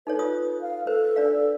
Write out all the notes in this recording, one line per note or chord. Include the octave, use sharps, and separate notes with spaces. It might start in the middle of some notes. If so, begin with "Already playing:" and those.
D#4 A4 B4 C#5
F4 D#6
F5
A4 B4 C5
D4 D5 F5